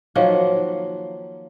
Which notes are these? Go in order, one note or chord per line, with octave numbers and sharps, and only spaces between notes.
D#3 F3 F#3 A#3